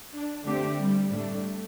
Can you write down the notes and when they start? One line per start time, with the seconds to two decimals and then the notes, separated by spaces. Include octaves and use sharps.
0.12 D4
0.45 D3 A3 C4 D4 G4
0.78 G3
1.11 A2 G3 A3 D4